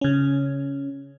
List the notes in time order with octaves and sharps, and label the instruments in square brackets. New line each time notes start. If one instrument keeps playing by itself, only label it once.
[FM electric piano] C#3 C#4